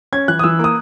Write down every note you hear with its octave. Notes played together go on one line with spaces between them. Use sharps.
C#4 G#6
E3 F#6
D#6
E3 E6
A#3 D#6